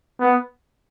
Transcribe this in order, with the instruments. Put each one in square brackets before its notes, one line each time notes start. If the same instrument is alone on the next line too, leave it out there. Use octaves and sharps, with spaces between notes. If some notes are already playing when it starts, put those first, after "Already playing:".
[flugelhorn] B3